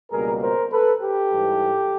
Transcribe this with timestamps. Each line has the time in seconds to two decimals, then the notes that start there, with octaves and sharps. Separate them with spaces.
0.11 C#2 B2 G3 A#3 G#4 A#4
0.41 A#4 C5
0.71 A4 B4
1.01 G4 A4
1.31 G#2 E3 G3